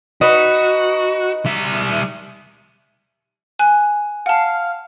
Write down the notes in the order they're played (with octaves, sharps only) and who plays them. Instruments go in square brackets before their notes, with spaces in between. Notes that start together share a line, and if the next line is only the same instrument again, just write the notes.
[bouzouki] D#4 B4 [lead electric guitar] F#4
[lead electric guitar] G3 E5
[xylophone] G#5 F#6
[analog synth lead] F5 [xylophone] F#5 A5